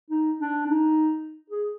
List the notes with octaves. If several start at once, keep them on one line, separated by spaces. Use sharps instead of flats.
D#4
D4
D4
D#4
G#4